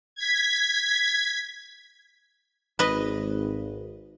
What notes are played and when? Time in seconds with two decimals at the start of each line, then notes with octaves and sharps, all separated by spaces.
0.15 G#6 B6
2.79 G#1 B4 D#5